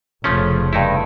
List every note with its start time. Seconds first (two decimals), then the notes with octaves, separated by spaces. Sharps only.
0.24 F1 C#3 F3 A3 C#4
0.73 G2 D#4 E4